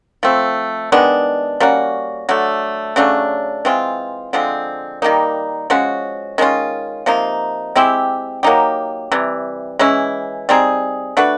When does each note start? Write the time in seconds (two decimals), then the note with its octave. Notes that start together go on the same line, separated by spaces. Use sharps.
0.23 F3 A3 C4
0.92 D#3 G#3 B3 D4
1.60 G3 A#3 C#4 F#4
2.29 D3 F#3 A3
2.96 C#3 F#3 A3 D4
3.65 E3 G#3 C4 F4
4.33 D3 F3 G#3 C4
5.02 D#3 G3 A#3 D#4
5.70 F3 G#3 C#4 F#4
6.38 D#3 G#3 C#4 F4
7.06 C3 F3 A#3 D#4
7.76 G#3 C4 E4 G4
8.43 F#3 A#3 D#4 G4
9.12 C3 E3 G3
9.79 E3 G#3 C#4 E4
10.49 G3 C4 D#4 G#4
11.17 A3 D4 F#4 B4